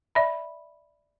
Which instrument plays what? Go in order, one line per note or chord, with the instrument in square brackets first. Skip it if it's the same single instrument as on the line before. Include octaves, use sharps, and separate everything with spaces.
[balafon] D5 E5 B5